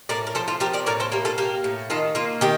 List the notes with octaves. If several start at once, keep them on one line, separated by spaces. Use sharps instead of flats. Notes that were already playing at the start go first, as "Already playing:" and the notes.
A2 A#4 D5
A#4
F3 A4 C5
F4 A4
F3 G4 A#4
A#4 D5
A2 A#4 D5
A4 C5
A#3 G4 A#4
F4 A4
A#3 G4 A#4
A2
D#3 F4 A4
A#3 F4
D#3 G4